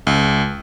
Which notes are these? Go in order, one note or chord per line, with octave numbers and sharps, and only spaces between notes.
C#2